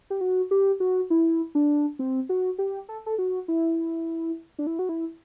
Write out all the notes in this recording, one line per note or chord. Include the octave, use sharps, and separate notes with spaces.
G4
F#4
G4
F#4
E4
D4
C4
F#4
G4
A4
A4
F#4
E4
D4
E4
F#4
E4